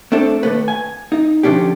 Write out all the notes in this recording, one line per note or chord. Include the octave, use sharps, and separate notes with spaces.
A3 C4 D4 A4
D#2 A3 B4
G#5
D#4
D3 F3 C#4 D4 G4